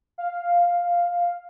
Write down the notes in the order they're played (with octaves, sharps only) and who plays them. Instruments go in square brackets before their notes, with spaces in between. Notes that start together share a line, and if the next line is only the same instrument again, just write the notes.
[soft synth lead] F5